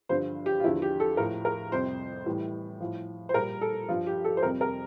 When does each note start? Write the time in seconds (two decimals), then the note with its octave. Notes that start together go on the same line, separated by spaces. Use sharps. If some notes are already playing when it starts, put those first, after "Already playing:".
0.09 G2 D3 F3 C5
0.46 G4
0.60 F4
0.64 E2 D3 F3 E4
0.82 G4
1.00 A4
1.17 A2 F3 A#4
1.45 A#4
1.72 F2 C3 G3 C5
2.26 A2 E3 G3
2.80 A2 F3
3.29 C5
3.34 A#2 G3 A#4
3.61 A4
3.89 G2 F3 F4
4.07 G4
4.24 A4
4.37 C5
4.43 F2 C3 G3 A#4
4.61 A#4